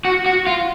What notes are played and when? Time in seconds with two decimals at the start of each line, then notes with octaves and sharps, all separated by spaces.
0.05 F#4
0.26 F#4
0.47 F4